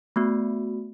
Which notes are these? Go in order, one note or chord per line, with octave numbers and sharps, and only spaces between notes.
A3 B3 F#4